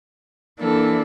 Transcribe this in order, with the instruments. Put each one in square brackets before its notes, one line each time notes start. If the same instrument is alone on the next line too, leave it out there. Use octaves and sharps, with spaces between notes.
[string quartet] E3 A#3 D4 A4